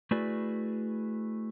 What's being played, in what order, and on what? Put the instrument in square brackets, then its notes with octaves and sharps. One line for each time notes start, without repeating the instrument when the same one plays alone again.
[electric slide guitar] A3 E4 F#4 G#4 B4 D5